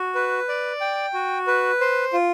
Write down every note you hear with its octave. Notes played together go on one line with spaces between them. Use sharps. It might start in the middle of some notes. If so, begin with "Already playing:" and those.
Already playing: F#4
B4
D5
G5
F#4
B4
C5
F4